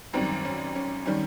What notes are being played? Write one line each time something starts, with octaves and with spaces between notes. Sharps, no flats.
G#1 F#2 D#3 G3 C4
C#4
C#4
D#3 G3 C#4